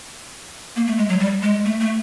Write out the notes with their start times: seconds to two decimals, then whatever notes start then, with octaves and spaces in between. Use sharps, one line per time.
0.76 A#3
0.87 A3
0.97 G#3
1.09 F#3
1.20 G3
1.42 G#3
1.65 A3
1.80 A3